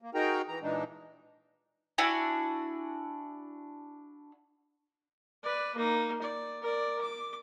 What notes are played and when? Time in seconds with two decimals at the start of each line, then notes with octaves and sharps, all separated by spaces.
0.02 A#3
0.15 D#4 F#4 G#4 A#4 G5 A#5
0.48 E3 A#5
0.62 A#2 E3 G#3 D4 D#4
1.98 D4 E4 F#4 G#5
5.43 B4 D5
5.75 A#3 D#4
6.21 D5
6.62 A#4 D5
7.01 D6